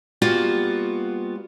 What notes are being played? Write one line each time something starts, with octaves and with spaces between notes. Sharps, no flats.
G3 A#3 B3 F4 F#4